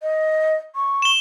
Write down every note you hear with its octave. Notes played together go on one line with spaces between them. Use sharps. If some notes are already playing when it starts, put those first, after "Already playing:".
D#5
C#6
E7 G7